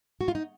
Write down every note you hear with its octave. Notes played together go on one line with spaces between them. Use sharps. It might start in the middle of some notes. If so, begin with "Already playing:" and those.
F#4
F4
D#4